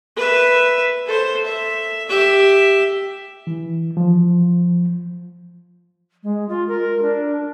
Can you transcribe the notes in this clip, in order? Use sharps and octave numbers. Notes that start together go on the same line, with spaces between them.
B4 E5
A4 C5
E5
G4 E5
E3
F3
G#3
F4
A#4
D4